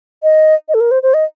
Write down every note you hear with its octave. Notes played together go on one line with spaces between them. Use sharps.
D#5
D#5
A4
A#4
C5
C5
D#5